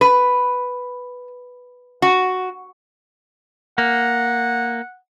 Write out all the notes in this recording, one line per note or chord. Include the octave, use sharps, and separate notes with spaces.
B4
F#4
A#3 F#5